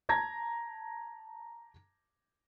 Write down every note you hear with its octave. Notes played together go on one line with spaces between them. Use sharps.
A5 A#5 G#6 A#6